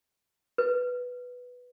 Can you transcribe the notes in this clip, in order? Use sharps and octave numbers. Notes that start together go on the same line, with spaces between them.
B4